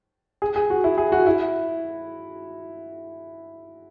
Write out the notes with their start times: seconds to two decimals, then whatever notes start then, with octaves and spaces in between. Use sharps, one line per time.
0.42 G#4
0.56 G#4
0.70 F#4
0.84 E4
0.98 G#4
1.12 F#4
1.27 E4